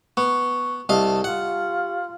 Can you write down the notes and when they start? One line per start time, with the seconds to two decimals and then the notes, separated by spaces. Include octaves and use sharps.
0.17 B3 C#6
0.89 C2 G4 D#5 F5 A5
1.24 F4 F#5